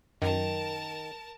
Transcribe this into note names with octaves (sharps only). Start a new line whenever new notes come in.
F#2 D#3 A#4 A5